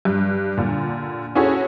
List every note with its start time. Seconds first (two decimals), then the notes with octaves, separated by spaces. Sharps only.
0.05 G2
0.57 A#2 D3
1.35 C#4 E4 F#4 G#4 A4 C#5